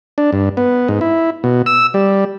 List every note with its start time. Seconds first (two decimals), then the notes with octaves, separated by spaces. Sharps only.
0.18 D4
0.32 G2
0.57 B3
0.88 G#2
1.01 E4
1.44 B2
1.66 E6
1.94 G3